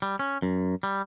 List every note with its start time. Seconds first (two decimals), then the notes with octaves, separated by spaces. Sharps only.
0.02 G3
0.19 C#4
0.42 F#2
0.83 G3